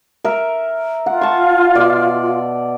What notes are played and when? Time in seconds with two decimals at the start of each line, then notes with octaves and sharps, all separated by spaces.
0.24 A#4 E5
1.06 F4 F#5
1.21 A5 C#6
1.75 B2 D5